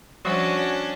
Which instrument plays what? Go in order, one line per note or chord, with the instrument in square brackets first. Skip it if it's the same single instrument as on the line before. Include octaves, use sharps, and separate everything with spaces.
[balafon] F3 G3 C5 [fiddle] C#4 D4 [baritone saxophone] F#4